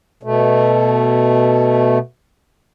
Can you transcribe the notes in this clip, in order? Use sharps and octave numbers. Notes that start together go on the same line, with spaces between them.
B2 A3